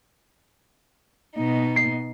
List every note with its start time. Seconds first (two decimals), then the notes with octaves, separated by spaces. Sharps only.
1.36 B2 D#4
1.76 C7